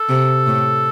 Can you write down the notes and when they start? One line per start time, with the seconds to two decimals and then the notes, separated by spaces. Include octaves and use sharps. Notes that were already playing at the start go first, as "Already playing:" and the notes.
Already playing: A4
0.09 C3
0.47 A2